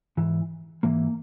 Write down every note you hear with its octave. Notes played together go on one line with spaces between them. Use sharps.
G#2 E3
G#2 E3 A#3